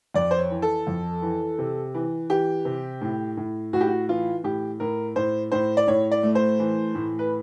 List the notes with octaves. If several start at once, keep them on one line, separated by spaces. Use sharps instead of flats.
F2 D5
C5
C#5
E3
A4
F2
E3
C3
E3
E3 G4
C3
A2
A2
A2 F#4
G4
F#4
E3 F4
A2 G4
A2 A#4
A2 C5
A2 C5
D5
A2 C#5
D5
A3
C5
E3
A2
B4